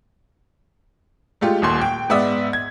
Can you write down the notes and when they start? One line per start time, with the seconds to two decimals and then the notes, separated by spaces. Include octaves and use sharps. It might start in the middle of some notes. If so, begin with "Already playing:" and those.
1.41 G#3 A3 F4 G4
1.62 D#1 D#2 C6
1.81 G5
2.09 G#2 B3 D5 E5 D#6
2.53 G#6